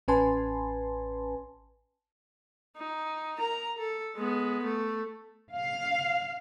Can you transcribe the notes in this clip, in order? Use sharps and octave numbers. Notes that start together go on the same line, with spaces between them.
A1 C#4 B4 G#5 A5 C6
D#4
A#4 A#5
A4
G#3 B3
A3
F5